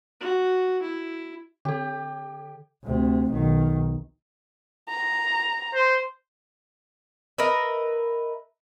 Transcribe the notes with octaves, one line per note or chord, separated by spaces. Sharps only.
F#4
E4
D3 G4 A4
D2 C3
B1 D#3
A#5
C5
A#4 B4 D#5 E5